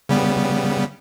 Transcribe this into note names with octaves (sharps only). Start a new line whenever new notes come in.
C#3 G3 B3